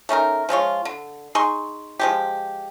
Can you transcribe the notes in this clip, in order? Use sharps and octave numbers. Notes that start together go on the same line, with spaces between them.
A3 C#4 D#4 A#4
F3 G#3 F4 C#5
D3
D#4 G#4 C6 C#6
F3 G#3 G4